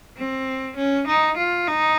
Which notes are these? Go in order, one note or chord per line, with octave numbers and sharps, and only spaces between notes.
C4
C#4
D#4
F4
D#4